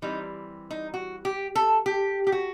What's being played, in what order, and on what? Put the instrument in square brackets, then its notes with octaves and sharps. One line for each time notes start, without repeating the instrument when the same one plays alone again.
[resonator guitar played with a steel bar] E3 G3 C4 D#4
D#4
F#4
G4
A4
G4
G4
F#4